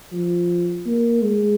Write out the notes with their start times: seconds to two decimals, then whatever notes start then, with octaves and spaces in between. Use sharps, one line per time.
0.12 F3
0.86 A#3
1.22 G#3